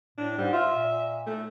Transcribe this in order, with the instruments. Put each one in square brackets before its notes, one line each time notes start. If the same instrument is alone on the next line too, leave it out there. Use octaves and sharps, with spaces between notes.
[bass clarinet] A2 [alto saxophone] D4
[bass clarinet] G#2 [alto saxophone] G3
[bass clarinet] F4 [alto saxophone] E5
[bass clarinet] A#2
[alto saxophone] A3